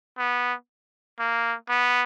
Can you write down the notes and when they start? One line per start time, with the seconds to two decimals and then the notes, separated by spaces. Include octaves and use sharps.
0.18 B3
1.19 A#3
1.69 B3